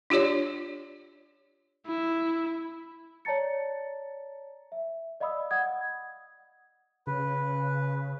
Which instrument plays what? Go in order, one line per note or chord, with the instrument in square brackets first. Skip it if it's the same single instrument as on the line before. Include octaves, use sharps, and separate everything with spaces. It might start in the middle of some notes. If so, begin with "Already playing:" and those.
[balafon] D4 F4 G4 C#5 D5
[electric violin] E4
[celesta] C#5 D5 A5 A#5 A6 C#7
E5
D5 D#5 F5 B5 D#6 E6
F#5 D#6 G#6
[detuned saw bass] C#3 [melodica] B4